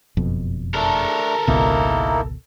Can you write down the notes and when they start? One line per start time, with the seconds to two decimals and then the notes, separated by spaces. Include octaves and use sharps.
0.17 F#1 F2 B2
0.75 A3 D4 A4 A#4
1.48 G#1 C#2 B2 A#3 D#4 E4